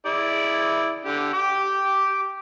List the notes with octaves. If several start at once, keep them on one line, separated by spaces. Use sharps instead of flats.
E4 G#4 D5
D3 G4
G4 G5 D6